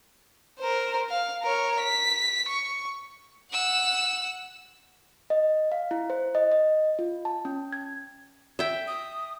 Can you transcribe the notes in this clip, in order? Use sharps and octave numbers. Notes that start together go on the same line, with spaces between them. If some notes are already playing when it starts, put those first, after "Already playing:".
A#4 C5
F5
A#4 C#5
B6
C#6
F#5 E6
D#5
F5
E4
C5
D#5
D#5
F4
A5
C#4
G#6
E5 G5
D#6